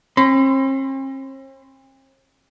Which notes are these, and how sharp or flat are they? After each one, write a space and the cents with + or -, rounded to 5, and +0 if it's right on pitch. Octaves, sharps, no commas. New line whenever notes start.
C4 +45 C6 -45